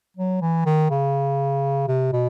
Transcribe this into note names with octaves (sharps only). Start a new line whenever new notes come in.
F#3
E3
D#3
C#3
C3
B2